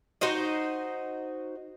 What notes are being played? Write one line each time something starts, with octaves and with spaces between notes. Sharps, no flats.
D#4 F#4 C5 D#5